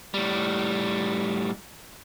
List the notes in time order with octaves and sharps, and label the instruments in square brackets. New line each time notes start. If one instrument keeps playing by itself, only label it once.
[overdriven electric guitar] A2 G3